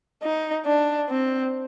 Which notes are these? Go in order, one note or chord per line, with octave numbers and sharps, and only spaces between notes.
D#4
D4
C4